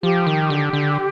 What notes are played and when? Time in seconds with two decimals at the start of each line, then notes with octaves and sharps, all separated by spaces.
0.03 F3 G4
0.27 D#3
0.50 D3
0.73 D3